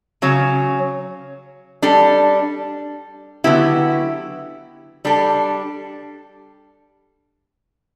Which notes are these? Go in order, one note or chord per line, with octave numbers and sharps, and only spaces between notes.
C#3 F#3 C#4
G3 D4 A4
D3 F#3 B3 E4 G4
G3 D4 A4